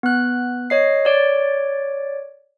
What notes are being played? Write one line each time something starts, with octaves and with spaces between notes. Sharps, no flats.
B3 F#6
C#5 D#5 C7
C#5 D5 D7